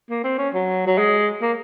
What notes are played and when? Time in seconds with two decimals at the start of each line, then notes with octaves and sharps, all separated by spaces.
0.10 A#3
0.24 C4
0.39 C#4
0.54 F#3
0.87 F#3
0.98 G#3
1.42 A#3